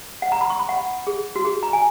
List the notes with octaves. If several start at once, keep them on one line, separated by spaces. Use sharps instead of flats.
F#5
A#5
B5
C#6
B5
F#5
G#4
F#4
G#4
A#5
G#5